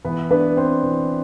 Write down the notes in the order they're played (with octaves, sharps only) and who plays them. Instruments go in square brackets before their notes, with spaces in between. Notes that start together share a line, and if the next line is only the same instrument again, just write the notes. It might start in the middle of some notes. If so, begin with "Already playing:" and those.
[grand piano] E3 B3 B4
B3 D4 B4
B3 C4 C5
E3